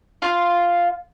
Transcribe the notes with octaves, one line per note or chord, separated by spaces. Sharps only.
F4 F5